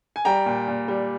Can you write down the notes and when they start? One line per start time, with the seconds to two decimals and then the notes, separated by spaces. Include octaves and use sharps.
0.16 G#5
0.25 G3 G5 A#5
0.46 A#2
0.68 A#2
0.88 G3